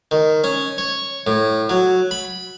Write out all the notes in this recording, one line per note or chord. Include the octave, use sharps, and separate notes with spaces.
D#3
C#4
C#5
A2
F#3
B5